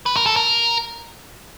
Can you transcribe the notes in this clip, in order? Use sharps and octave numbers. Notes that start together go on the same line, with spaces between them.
B4
A#4
A4
A#4